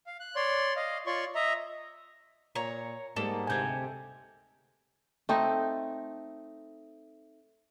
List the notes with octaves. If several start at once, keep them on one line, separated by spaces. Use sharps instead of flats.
F5
F#6
C#5 D5 C6
D#5 F5
F4 C#5 D5 C6 C#6
D#5 E5 A#5
A#2 C#5 A#5
G#2 G3 A#3 B3 A4
D2 C3 G#5 G6 G#6
A3 C4 D#4